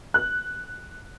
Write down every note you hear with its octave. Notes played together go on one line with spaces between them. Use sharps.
F#6